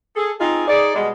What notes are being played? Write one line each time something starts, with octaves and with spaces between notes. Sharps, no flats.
G#4 A4
C4 D#4 F4 G#4
D#4 G#4 D5
B2 G3 G#3